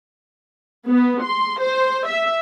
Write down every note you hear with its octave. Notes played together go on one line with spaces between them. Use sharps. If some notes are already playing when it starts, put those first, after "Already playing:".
B3
C6
C5
E5